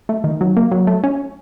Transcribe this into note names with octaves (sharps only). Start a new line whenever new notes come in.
A3
D#3
F#3
A#3
F#3
A3
C#4